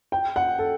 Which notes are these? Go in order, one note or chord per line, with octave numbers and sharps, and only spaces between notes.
G5
F#5
A4